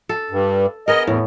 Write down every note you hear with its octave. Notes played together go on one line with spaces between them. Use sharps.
A4
G2
B3 G#4 A#4 D#5
E2 A2